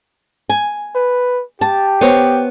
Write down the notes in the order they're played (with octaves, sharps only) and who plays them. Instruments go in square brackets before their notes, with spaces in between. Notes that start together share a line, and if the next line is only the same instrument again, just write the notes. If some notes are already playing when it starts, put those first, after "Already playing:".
[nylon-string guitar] G#5
[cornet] B4
[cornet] G4 [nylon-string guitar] A5
[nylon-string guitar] B3 C5 C#5